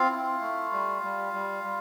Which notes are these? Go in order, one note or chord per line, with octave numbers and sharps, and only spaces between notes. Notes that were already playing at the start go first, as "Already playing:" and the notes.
Already playing: C4 F4 F5
E4
A3
G3
G3
G3
G3